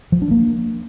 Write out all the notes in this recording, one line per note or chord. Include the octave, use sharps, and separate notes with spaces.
F3
D4
A#3